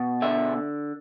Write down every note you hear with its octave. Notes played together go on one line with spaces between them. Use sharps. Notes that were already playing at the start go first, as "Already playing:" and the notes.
Already playing: B2
D3 E5